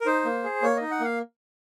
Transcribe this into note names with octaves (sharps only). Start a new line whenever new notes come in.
A#4
D#4 C5
A#3
G#4
A#3 C#5
D#4 D#5
F#5
A#3 F5